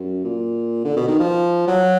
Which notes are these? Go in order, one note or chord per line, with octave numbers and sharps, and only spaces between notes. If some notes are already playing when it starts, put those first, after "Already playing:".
Already playing: F#2
A#2
D3
B2
D#3
F3
F#3